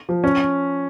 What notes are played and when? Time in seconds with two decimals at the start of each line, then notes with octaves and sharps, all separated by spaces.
0.09 F3
0.24 C#4